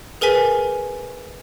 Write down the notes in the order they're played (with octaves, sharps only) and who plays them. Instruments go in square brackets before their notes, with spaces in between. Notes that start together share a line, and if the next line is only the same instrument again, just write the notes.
[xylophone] G#4 A#4 B4 G#5 B6